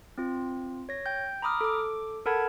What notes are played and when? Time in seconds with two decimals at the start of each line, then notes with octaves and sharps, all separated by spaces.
0.18 C4 F4
0.89 C#5 A#6
1.06 G5 G6
1.42 A#5 B5 D6 D#6 F6
1.61 A4 D6
2.26 A4 A#4 F#5 A5 B5 G#6